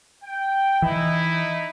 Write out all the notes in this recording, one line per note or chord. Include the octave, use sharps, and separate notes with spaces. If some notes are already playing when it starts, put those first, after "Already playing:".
G5
E3 D#4 E4